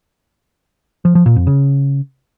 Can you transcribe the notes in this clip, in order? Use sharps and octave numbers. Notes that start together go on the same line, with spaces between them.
F3
F3
A#2
F2
C#3